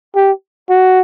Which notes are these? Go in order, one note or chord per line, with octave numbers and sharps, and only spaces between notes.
G4
F#4